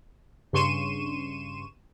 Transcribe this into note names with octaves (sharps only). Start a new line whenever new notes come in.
G2 C#3 C6 C#6 D#7 E7